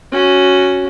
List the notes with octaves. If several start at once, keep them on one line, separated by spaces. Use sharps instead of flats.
C#4 F#4